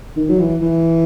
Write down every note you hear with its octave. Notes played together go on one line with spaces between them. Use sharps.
D#3
F#3
E3
E3